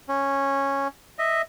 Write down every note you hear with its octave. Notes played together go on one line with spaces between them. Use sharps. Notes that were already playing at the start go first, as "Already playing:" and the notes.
C#4
D#5 E5